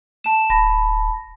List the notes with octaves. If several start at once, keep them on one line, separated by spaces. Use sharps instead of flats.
A5 E7
D1 A5 B5 A#6